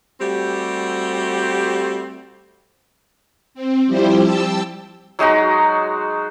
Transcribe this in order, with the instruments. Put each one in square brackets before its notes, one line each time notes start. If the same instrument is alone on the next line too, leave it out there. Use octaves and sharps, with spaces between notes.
[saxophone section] G3 A3 C4 F#4 G4
[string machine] C4
F3 G3 E4 G4 C5
G5 A5 E6
[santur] F#3 G#3 D#4 F#4